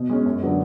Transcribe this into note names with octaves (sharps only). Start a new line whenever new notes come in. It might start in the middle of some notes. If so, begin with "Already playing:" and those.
Already playing: B2
G#3 C#4
F#2
D3 F#3 B3